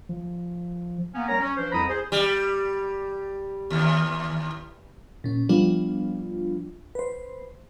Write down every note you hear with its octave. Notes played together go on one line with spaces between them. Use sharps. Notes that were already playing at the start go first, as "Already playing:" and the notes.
F3
A#3 B3 C#4
G3 A#4 C#5 A#5
C#4
F3 D4 B4 C5
C2 F2 E4 A#5 B5 D#6
G#4 C5
G3
D#2
A#2 C#4
F3 G3 B3 D4 F4
B4 C5